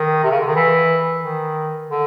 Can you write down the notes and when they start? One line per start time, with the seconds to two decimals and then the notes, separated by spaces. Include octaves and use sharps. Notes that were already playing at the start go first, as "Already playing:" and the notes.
Already playing: D#3
0.24 C3
0.31 C#3
0.40 D3
0.47 D#3
0.55 E3
1.22 D#3
1.91 D3